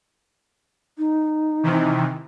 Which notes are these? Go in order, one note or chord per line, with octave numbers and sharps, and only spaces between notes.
D#4
C3 D#3 E3